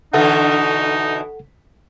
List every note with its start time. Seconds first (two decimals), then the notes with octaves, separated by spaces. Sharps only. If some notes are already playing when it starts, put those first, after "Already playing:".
0.13 B2 D3 E3 D#4 A4 F#5